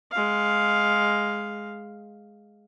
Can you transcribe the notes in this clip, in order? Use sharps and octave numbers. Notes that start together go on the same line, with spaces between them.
G#3 F5